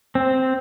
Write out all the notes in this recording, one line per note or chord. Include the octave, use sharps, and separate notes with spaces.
C4